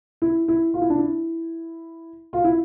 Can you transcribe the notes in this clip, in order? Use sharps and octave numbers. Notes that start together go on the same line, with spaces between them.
E4
E4
F4
E4
D4
E4
F4
E4